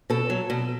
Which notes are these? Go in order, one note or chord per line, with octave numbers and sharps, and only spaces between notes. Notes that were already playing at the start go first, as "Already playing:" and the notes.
B2 A4
F#3
B2